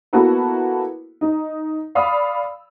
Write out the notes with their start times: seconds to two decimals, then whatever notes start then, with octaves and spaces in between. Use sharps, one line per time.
0.13 A#3 B3 E4 F#4 A4 B4
1.21 D#4
1.95 D5 F5 B5 D#6 E6